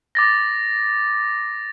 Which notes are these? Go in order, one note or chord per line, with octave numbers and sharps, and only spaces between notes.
D6 A6 A#6